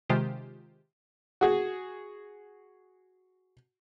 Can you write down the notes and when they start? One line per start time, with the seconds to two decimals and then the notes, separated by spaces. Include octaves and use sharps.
0.09 C3 D#3 G#3 F4 G4 C5
1.41 F#4 G#4